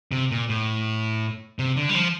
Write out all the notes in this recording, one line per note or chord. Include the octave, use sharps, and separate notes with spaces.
C3
A#2
A2
C3
D3
G3
F3